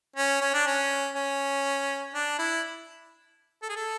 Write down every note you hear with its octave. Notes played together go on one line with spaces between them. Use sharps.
C#4
C#4
D4
C#4
C#4
D4
E4
A4
G#4
A4